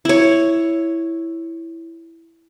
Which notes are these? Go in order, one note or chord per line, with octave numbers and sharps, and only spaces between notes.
E4 C#5